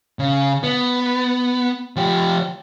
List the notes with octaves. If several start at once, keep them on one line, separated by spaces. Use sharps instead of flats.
C#3
B3
F3 G4